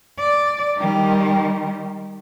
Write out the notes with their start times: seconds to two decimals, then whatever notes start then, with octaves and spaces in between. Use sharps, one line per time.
0.19 D5
0.78 D#3 G3